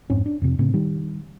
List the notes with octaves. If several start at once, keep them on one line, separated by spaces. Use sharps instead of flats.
F2 G#2 C4 C#4
D4
F2 C3
A2 C#3 B3 C4
D#3 G3